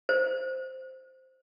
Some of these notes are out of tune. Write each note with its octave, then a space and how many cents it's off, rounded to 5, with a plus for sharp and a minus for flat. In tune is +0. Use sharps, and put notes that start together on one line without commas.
C5 -5